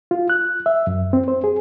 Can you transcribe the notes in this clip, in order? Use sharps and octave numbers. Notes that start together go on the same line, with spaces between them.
F4
F#6
E5
F#2
C4
C5
G#4